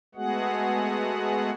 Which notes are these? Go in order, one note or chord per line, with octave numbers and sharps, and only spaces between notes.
G#3 A3 B3 F#4 G#4 F#5